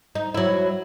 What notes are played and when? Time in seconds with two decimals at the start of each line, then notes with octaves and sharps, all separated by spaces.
0.15 D#4
0.34 F#3 E4